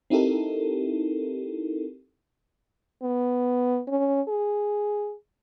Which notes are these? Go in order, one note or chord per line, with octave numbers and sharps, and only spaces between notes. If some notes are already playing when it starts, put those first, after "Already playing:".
C4 D#4 E4 G4 A4 A#4
B3
C#4
G#4